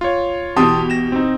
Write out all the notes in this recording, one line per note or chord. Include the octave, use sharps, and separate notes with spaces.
F4 C#5
B2 E3 G4 A5 C6 D#6
A#6 E7
C4 D#4